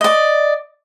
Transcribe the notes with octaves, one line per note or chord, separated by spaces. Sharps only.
D5 D#5